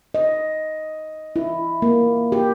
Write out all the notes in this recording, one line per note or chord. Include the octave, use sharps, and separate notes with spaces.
D#5
E4
A#3
G4